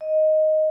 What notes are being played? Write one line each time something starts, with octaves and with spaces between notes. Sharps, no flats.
D#5